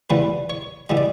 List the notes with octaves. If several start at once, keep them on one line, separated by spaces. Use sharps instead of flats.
E2 C#3 E3 G3 B4
C#5
C#3 E3 G3 D#5
D5